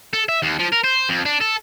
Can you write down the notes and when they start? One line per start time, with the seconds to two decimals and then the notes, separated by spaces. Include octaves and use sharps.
0.13 A4
0.29 E5
0.43 D#2
0.59 F3
0.73 A#4
0.84 C5
1.09 F2
1.25 D4
1.41 A4